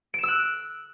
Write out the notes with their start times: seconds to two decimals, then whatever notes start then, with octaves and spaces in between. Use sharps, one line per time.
0.14 D7
0.19 E7
0.23 E6
0.28 F#6